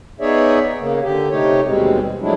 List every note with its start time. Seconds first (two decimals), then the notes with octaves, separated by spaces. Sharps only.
0.20 B3 D#4 G#4 C#5 D5 E5
0.79 C#3 A#3
1.01 D3 G4
1.30 C3 A3 D#4 G4 C#5
1.66 D#2 B2 G3 G#3 C4
2.21 F3 F#3 G#3 A3 D4 E4